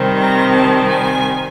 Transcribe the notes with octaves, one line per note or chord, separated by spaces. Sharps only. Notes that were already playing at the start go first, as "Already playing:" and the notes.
Already playing: C3 D#3 G3 C4
A#5
A5
G#5